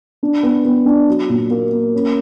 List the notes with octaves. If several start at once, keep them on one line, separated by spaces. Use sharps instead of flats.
D4
B3
B3
D4
F#3
A#2
A#3
A#3
C#4